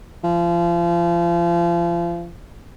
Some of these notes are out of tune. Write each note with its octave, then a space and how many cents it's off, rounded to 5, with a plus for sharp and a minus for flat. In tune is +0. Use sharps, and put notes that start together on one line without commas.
F3 -30